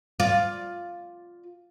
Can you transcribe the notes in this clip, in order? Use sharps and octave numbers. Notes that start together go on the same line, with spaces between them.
F4 D5